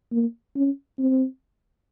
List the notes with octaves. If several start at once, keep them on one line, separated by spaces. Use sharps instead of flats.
A#3
C#4
C4